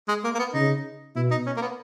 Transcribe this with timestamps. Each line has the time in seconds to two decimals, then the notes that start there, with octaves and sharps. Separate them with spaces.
0.09 G#3
0.24 A#3
0.35 A#3
0.39 B3
0.54 C#3 D#4
1.16 B2 E4
1.31 D#4
1.46 C#4
1.57 A#3
1.62 B3